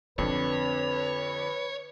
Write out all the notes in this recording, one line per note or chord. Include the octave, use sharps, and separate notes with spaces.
F2 D3 C4 D4 B4 C#5